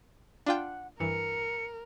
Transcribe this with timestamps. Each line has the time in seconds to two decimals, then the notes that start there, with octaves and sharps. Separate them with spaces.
0.46 D4 F4 F#5 G5
1.00 G2 E3 A#4 C#7